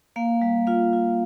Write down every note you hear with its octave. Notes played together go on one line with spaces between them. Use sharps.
A#3 F5
G3
F4 F5
F4